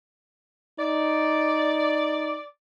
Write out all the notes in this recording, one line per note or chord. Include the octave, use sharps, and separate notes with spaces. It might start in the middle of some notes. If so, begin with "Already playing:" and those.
D#4 D5